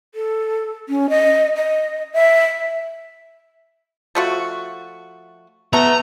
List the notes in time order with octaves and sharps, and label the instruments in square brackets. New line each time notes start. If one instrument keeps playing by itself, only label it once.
[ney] A4
C#4
D#5
D#5
E5
[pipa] F3 A3 F#4
[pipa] A3 A4 [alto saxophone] B3 [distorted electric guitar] A#5